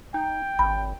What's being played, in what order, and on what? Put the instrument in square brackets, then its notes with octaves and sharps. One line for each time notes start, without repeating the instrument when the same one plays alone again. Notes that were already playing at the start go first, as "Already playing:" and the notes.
[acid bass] D#4 [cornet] G5
[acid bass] G#1 [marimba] B5